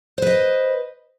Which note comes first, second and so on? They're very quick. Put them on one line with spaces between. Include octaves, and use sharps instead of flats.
C5 B4 D#5